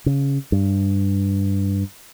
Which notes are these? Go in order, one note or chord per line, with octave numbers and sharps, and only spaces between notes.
C#3
G2